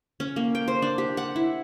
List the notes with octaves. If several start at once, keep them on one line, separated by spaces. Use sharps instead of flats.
C#4
A#3
G5
C5
D4
G4
F#5
E4